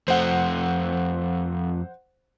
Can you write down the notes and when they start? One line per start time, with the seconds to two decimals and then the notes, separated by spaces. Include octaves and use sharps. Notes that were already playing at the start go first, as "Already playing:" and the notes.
0.08 F2 A3 C5 F#5